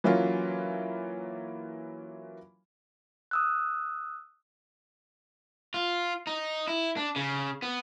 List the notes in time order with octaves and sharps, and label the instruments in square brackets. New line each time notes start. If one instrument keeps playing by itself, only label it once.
[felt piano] E3 F#3 A#3 C#4 F4
[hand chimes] D#6 E6 F#6
[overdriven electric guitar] F4
D#4
E4
D4
C#3
B3